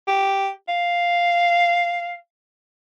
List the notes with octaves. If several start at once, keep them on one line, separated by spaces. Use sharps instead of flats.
G4
F5